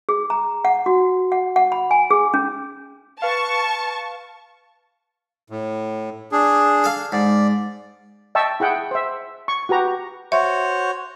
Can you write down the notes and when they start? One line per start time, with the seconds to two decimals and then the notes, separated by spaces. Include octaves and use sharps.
0.09 G#4
0.30 A#5
0.65 F#5
0.86 F#4
1.32 F#5
1.56 F#5
1.72 B5
1.91 G#5
2.11 G#4
2.34 C#4
3.22 B4 F5 A5 C#6
5.50 A2
6.32 D4 G#4
6.84 A4 F5
7.12 G#2 D5
8.35 D#5 E5 G5 A5 C#6 E6
8.60 E4 G#4 F#5 G5
8.91 C5 E5
9.48 C#6
9.69 F#4 G4 B4 A#5
10.32 F#4 C5 C#5 E5